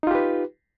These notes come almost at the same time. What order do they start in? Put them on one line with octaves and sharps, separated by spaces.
D#4 F4 G4 B4